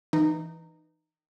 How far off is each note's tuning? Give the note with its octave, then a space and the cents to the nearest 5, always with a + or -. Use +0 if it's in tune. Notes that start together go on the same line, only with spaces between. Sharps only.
E3 +0 D#4 -15